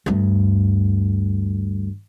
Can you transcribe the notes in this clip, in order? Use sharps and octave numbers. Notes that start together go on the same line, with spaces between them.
D2 G2